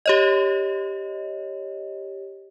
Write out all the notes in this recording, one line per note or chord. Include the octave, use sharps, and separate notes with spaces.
G4 C#5 D#5